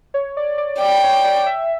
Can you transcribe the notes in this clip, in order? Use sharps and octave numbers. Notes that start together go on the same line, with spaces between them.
C#5
D5
D5
D5 G5
C#5
D5
E5